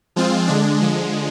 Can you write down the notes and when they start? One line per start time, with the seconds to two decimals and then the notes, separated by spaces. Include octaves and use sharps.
0.16 F3 G#3 C4 F4
0.47 D3 G#3 D4
0.78 D3 F3 G#3